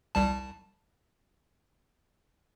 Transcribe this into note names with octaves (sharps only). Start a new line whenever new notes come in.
C2 G3 A5